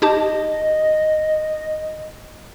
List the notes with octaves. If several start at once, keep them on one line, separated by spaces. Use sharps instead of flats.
D#4 G4 D#5 A5